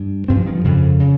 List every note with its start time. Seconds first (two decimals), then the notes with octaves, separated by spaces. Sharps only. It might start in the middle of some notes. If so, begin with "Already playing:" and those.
Already playing: G2
0.28 G2 C4
0.37 F3
0.46 D#3
0.55 F3
0.64 F2 C#3
1.00 C#3